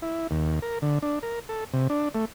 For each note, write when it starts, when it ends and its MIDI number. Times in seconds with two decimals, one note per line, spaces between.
0.02 0.27 64
0.31 0.59 39
0.62 0.79 70
0.82 0.99 50
1.02 1.19 62
1.23 1.39 70
1.49 1.64 69
1.73 1.88 48
1.90 2.09 62
2.15 2.25 57